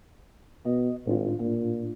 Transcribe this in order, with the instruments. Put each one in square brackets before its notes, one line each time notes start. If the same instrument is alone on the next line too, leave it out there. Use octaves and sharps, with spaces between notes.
[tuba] B2 [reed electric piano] D#5
[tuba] G#1 [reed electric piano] A2 D4 F4
[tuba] A#2